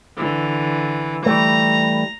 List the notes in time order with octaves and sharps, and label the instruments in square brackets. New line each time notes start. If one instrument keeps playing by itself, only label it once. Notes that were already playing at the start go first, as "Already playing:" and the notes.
[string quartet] D3 E3
[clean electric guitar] E3 G3 A3 [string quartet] A#5